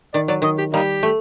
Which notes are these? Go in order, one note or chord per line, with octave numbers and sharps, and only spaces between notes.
D#3 D5
F#3 D5
D#3 D#5
G4
G3 A#3 D#4 G4
A3